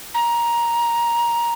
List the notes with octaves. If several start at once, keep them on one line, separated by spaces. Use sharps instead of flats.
A#5